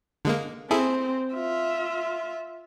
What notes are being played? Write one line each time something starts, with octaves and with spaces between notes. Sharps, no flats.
D3 G#3 A#3
C4 E4 G#4 A4
F4 E5